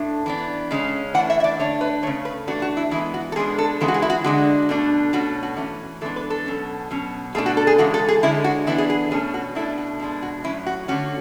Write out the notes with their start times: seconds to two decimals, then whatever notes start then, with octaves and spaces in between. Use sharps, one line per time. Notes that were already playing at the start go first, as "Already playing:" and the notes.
Already playing: A2 A3 D4
0.26 E3 B3 D4
0.71 C#3 G#3 C#4
1.14 E3 A3 D4 F#5
1.30 E5
1.40 E5
1.44 D5
1.59 D3 A3 D4 C#5
1.81 B4
2.03 C#3 F#3 A3 C#5
2.25 B4
2.47 E3 A3 D4 F#4
2.62 F#4
2.77 E4
2.91 E3 G#3 B3 E4
3.14 F#4
3.32 A4
3.36 B2 G#3 B3 D4 G#4
3.58 A4
3.80 C#3 E3 G#3 B3
3.88 F#4
3.94 G#4
4.02 E4
4.10 F#4
4.24 D3 G#3 D4 F#4
4.69 B2 A3 D4
5.13 B2 A3 C#4 F#4
5.43 F#4
5.57 E3 A3 C#4
6.01 E3 G#3 B3 D4 A4
6.16 B4
6.30 A4
6.46 B2 F#3 C#4
6.91 B2 F#3 C#4
7.35 B2 A3 D4 G#4
7.46 F#4
7.57 A4
7.67 G#4
7.78 C#3 E3 G#3 F#4
7.94 A4
8.09 G#4
8.23 D3 G#3 C#4 E4
8.44 F#4
8.67 E3 B3 D4 E4
8.78 G#4
8.90 G#4
9.11 B2 A3 C#4 G#4
9.34 F#4
9.55 B2 A3 D4 E4
9.78 F#4
10.00 B2 G#3 D4
10.23 F#4
10.44 A2 F#3 C#4 E4
10.66 F#4
10.88 D3 A3 C#4 F#4